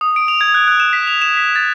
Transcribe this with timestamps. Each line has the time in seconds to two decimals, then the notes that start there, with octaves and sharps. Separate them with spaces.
0.01 D#6
0.16 D7
0.28 F7
0.41 G#6
0.54 F#6
0.68 F#6
0.80 E7
0.93 B6
1.07 F7
1.22 E7
1.37 B6
1.56 A6